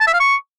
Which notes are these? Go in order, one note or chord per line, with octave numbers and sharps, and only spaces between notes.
A5
E5
F5
C#6